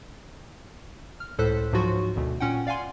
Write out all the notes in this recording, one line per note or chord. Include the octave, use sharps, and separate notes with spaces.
F6
C#2 A2 A4 C5 F#6 B6
G#2 F3 F#3 F4 F#4
G#1 D2 B2 A3
A#2 C#4 F#5 G5
D5 F5 F#5 G#5 C6